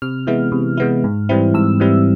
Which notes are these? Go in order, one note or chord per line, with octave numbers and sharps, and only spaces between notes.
C3 F6
E3 G#3 B3 E4
C3
E3 G#3 B3 E4
G#2
E3 G3 C4 E4
G#2 E6
E3 G3 C4 E4